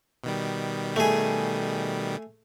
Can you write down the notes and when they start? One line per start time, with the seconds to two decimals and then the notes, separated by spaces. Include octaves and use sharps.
0.24 B2 D#3 G3
0.96 A3 G#4